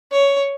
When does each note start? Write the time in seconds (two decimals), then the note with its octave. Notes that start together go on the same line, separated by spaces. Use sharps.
0.12 C#5